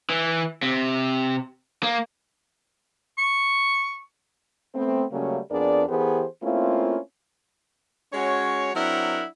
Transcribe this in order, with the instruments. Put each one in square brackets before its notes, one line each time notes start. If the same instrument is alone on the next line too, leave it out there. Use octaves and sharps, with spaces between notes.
[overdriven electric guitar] E3
C3
A#3
[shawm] C#6
[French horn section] A3 B3 C4
C#3 F#3 G3 A3 A#3 C#4
F2 B3 D4 G#4 A#4 D5
E3 B3 G4 G#4 A#4 C5
A3 A#3 C4 C#4 E4 F4
[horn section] G#3 C#4 F#4 C#5
F#3 C4 D4 E4 A#4 F#5